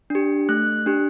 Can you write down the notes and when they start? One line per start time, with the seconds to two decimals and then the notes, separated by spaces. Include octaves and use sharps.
0.10 D4 G4
0.49 A3 F#6
0.86 D4 G4